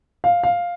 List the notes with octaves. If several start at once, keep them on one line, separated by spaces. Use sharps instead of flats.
F5
F5